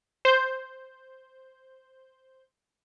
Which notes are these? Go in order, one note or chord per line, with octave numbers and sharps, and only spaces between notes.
C5 G6